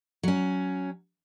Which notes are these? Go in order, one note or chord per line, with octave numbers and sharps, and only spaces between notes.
F#3 C#4